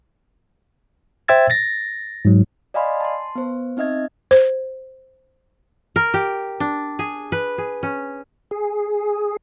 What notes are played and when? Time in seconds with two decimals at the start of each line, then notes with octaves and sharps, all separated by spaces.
1.28 C5 E5 G5 E6 G#6 A6
1.50 A6 A#6
2.25 G#2 F#3
2.74 D5 D#5 F5 G#5 B5 C6
3.00 A5 C6
3.35 B3 C5
3.77 C4 D#4 D#5 E5 G#6
4.31 C5
5.96 A#4
6.14 G4
6.60 D4
6.99 G#4
7.32 B4
7.58 G#4
7.83 C#4
8.51 G#4